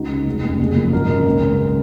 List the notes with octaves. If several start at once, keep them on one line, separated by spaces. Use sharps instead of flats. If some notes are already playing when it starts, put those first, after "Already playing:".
Already playing: C#2 D#4 F#4
C#3
G#3
F1
D#2 C#3 G#3
F#1
F#2 F3 A#3
G#1 F#4 A#4
F#2 D#3
C#2
C#3 G#3